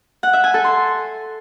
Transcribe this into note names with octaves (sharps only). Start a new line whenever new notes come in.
F#5
E5
G#5
A4
C6